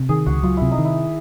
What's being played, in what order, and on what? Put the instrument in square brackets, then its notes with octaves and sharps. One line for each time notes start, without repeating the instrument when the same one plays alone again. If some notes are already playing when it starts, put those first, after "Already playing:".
Already playing: [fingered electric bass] C3
[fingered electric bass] D#3 [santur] G#4
[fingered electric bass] C#2 [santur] F#4
[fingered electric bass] F#3 [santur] F4
[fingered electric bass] C3 [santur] E4
[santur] D#4
[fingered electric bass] D#3
[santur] E4